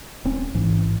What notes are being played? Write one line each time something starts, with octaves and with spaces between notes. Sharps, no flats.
D1 C4 C#4
A1 G#2 E3